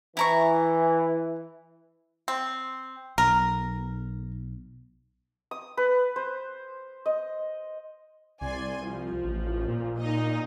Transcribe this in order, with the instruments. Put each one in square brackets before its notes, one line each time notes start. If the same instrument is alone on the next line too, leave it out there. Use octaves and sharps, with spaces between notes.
[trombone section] E3 [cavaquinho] E4 A#5 C#6
[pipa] C4
[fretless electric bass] B1 [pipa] A#4
[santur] D#6
B4
C5
D#5
[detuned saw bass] C2 [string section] D5 G#5 C6
[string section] F3
[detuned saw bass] A1
A#2
[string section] D#4 D#5